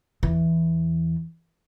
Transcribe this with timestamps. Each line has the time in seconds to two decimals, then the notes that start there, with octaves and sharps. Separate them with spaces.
0.23 E2 E3